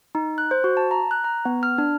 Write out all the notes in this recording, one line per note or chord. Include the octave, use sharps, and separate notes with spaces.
D#4
F#6
C5
F#4
A5
A#5
F#6
A#5
B3
F6
D4